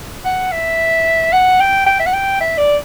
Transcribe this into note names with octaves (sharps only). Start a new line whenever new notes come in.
F#5
E5
F#5
G5
G5
E5
F#5
G5
E5
D5